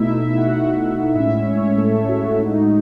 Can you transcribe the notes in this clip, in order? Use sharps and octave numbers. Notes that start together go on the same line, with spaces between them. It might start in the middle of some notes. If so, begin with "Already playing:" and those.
Already playing: B2 A3 D#4 E4 E5
E4 E5
F#4 F#5
F#4 F#5
A2 G#3 C#4 E4 E5
C#4 C#5
A3 A4
F#4
A2 G#3 D#4